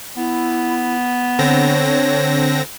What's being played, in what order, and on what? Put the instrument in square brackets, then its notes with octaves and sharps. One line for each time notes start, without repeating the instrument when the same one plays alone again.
[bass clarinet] B3 [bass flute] E4
[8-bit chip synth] D3 C4 A#6 [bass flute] C#5